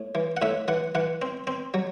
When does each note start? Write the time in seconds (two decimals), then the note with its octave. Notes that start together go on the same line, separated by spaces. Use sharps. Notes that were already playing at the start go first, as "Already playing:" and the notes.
Already playing: A2
0.15 E3
0.37 F#5
0.42 A2 E5
0.68 E3 F#5
0.95 E3 F#5
1.22 C4
1.47 C4
1.74 F#3